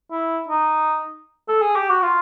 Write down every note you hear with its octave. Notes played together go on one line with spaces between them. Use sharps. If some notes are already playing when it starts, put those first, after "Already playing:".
E4
D#4
A4
G#4
G4
F#4
F4